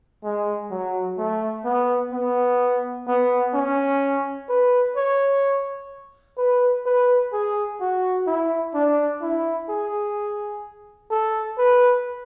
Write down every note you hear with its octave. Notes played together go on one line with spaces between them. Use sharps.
G#3
F#3
A3
B3
B3
B3
C#4
B4
C#5
B4
B4
G#4
F#4
E4
D4
E4
G#4
A4
B4